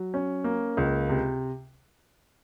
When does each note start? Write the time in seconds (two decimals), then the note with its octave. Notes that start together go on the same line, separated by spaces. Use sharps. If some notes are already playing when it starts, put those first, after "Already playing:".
Already playing: F#3
0.14 C#4
0.44 A#3
0.77 C#2
1.09 C3